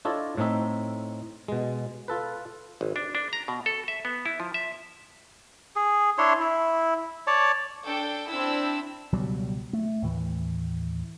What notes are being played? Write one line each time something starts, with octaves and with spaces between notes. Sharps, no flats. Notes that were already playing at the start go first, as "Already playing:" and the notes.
D4 E4 F4 A4 C#5 D#5
A2 A3 C4 D#4 E5
B2 G#3
F4 A4 B4
G#1
D4
D4
A#5
B2
A4
E5
B3
E4
F3
E5
G#4
D4 E4 C#5 C6
E4
C#5 D5 A5
D4 A4 G5
C4 D4 E4 E6
C#2 B2 F#3 G3
A3
D#2 A2 E3